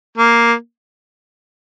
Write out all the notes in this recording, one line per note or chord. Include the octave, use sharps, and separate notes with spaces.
A#3